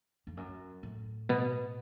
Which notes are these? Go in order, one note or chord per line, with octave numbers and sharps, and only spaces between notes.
F2
F#2
A2
B2 B3